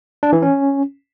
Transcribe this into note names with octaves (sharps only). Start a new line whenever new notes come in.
D4
E3
C#4